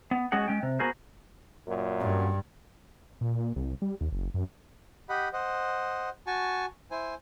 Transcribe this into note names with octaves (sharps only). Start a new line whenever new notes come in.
B3
G#3 C#4 F#4 G#4 F#5
G#3 C#4 G5
C3
B3 F#4 G#4 A#4 C5
F#2 A#2
G2
A#2
A#2
C2
G3
D#2
F#1
F#2
G4 D#5 F#5 B5
C5 D#5 F#5
F#4 G#5 A5 C#6
E4 C5 G#5